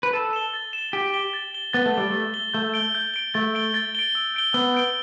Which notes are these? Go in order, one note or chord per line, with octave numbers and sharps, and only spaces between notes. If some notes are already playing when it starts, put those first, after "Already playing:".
B4
A4 A6
E7 G7
A6
E7
G7
G4 A6
G7
A6
G7
B3 A6
A3
G3 G7
A3 A6
G7
A3 G6
D7 G7
G6
D7 G7
A3 A6
D7 G7
A6
D7 G7
E6
G6 D7 G7
B3 E6
G6 D7 G7